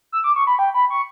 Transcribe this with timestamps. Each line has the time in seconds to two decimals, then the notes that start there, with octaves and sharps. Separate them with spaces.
0.12 E6
0.24 D6
0.36 C#6
0.47 B5
0.59 G5
0.74 B5
0.90 C#6